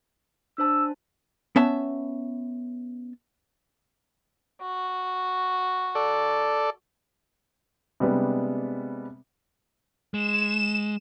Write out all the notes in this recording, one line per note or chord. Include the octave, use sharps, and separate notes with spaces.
D4 C5 A5 E6
B3 C#4 E5 A5
F#4
A4 D5
C3 G3 G#3 B3 D4
G#3 E7